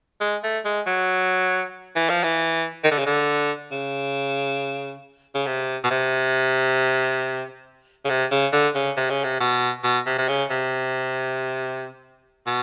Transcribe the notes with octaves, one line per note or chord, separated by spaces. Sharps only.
G#3
A3
G#3
F#3
E3
F3
E3
D#3
D3
C#3
D3
C#3
C#3
C3
B2
C3
C#3
C3
C#3
D3
C#3
C3
C#3
C3
B2
B2
C3
C3
C#3
C3
B2